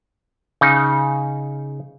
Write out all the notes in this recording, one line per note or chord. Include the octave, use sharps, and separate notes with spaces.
C#3 D#4